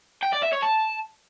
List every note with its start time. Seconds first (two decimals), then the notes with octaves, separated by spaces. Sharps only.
0.23 G5
0.33 D5
0.43 E5
0.53 C#5
0.63 A5